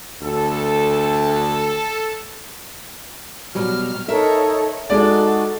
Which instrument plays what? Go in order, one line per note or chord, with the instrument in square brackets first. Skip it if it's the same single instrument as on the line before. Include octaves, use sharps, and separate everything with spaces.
[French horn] D2 [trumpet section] A4
[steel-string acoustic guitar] B2 F#3 G3 [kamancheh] F6
[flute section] D#4 A4 [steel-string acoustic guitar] A#4 E5 [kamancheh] C#5
[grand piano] G#3 D5 [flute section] D#4 F#4 [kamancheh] A4